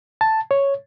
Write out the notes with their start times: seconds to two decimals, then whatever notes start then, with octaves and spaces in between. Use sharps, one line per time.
0.21 A5
0.51 C#5